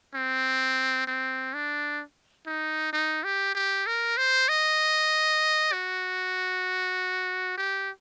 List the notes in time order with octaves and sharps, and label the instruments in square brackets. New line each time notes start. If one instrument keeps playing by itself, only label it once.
[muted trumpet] C4
C4
D4
D#4
D#4
G4
G4
A#4
C5
D#5
F#4
G4